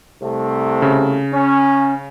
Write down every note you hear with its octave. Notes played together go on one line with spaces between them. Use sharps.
C2 C3 A3
C#3
C#4